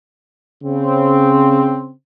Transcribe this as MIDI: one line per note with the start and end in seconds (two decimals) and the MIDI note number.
0.63 1.93 49
0.63 1.93 60